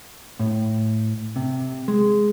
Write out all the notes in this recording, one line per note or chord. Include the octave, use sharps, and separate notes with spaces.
A2
C3
G#3